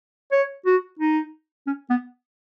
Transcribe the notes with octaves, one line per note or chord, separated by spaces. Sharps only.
C#5
F#4
D#4
C#4
B3